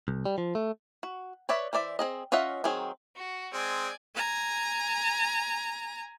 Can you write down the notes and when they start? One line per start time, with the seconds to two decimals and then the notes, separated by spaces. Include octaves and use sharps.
0.08 C2
0.25 G3
0.38 F3
0.55 A3
1.03 F#4
1.49 B4 C#5 D5 E5
1.73 E3 C5 D5 E5
1.99 C4 G#4 D#5
2.32 C#4 F4 D#5 E5 F#5
2.64 D#3 F#3 C4 G#4
3.16 F#4
3.53 G#3 C4 D5 G#5
4.15 G#5 A#5